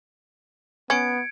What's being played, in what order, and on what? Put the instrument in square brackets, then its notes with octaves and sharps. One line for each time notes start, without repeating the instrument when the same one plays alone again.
[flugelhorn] B3 [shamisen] C#4 [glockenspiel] G#6 C#7 D7